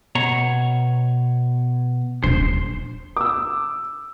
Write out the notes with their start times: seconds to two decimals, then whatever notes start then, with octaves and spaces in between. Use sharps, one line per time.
0.15 B2 C#5 A#5
2.24 D#1 D4 C5
3.17 D6 E6